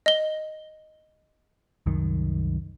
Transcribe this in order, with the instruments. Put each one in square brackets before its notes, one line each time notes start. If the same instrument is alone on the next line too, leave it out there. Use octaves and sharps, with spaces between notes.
[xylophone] D#5 G7
[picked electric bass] C2 F#2 D#3